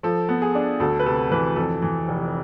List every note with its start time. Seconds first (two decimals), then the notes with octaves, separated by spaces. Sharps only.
0.03 F3 A4
0.29 B3
0.42 G#4
0.55 D4
0.80 D2 A4
1.00 B4
1.06 C3 A4
1.31 E3 B4
1.56 F2 A4
1.82 E3
2.08 F1